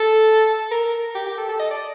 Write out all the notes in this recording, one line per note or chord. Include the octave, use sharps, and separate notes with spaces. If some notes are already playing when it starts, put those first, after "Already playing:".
Already playing: A4
A#4
G4
G4
A4
A4
D#5
D5